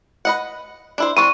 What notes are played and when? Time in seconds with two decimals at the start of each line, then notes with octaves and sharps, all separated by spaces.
0.25 B4 D#5 F#5
0.98 D4 E4 C5
1.17 E3 C4 D4 C#6 D#7